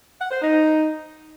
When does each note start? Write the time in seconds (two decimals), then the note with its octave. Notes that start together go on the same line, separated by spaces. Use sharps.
0.20 F#5
0.31 C5
0.42 D#4